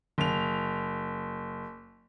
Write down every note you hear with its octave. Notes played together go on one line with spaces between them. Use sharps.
F#1 F7